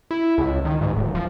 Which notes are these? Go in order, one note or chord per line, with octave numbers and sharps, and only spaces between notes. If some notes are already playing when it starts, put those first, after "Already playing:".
E4
C#2
D#3
G#2
D1
F3